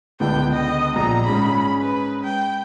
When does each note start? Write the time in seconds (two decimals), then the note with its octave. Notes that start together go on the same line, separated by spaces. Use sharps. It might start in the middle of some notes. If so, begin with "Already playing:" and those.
0.20 C#2 D3 B3 G5
0.52 D#5
0.96 A#1 A#5
1.26 G#2 C#4 G#4 B5
1.81 B4
2.24 G5